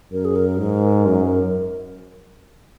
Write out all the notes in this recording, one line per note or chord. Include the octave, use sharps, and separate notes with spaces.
F#2 A#4
G#4
A#4
G#2
F#2